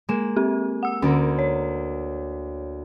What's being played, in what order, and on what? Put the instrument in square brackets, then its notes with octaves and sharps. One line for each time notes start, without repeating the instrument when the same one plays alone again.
[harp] G#3 A#3 E7
[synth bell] C4 G4
F#5 E6
[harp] D2 A#3 A#4 [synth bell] C#4
[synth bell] C#5